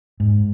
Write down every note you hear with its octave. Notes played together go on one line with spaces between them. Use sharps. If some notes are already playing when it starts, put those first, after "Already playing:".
G#2